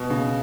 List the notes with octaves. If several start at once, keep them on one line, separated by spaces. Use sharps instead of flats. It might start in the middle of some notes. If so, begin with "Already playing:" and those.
Already playing: B2
C#3